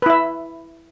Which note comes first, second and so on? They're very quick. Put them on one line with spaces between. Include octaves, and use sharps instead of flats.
B4 E4 E5